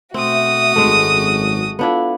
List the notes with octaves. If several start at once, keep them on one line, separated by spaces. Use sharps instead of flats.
B2 A3 C4 F#4 E5 D#6
G#1 F#2 G#3 A3
B3 D4 E4 F4 A4 F5